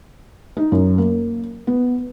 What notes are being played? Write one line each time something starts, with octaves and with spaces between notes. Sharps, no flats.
D#4
F#2
A#3
B3